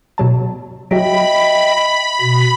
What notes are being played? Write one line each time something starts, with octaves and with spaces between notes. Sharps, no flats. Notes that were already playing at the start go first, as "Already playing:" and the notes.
B2 F#3 A5
F#3 F#4 D#5 E5 G5 B5
B2